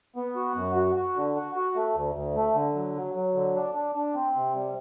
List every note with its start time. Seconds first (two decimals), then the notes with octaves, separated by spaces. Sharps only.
0.16 B3
0.36 F#4
0.55 F#2
0.76 F#4
0.96 F#4
1.16 D3
1.36 F#4
1.56 F#4
1.75 A3
1.95 D2
2.15 D2
2.36 A3
2.55 D3
2.75 F#3
2.95 F#3
3.15 F#3
3.35 D3
3.55 D4
3.74 D4
3.95 D4
4.15 C4
4.35 C3
4.55 G3